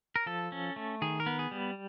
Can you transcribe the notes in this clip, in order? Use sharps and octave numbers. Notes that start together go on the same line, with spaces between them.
A#4
F3 A4
C#4
A3
D#3 G#4
A#4
B3
G#4
G3